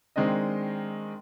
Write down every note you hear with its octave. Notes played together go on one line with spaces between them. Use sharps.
D#3 G#3 C4 D4 D#5